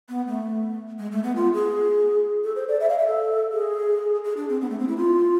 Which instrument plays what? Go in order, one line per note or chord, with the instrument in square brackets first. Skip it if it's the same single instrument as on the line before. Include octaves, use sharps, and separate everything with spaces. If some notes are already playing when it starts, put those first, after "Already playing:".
[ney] B3
A3
G#3
A3
B3
F4
G#4
A4
C5
D5
E5
F5
E5
A4
G#4
G#4
D4
C4
B3
A3
C4
E4
F4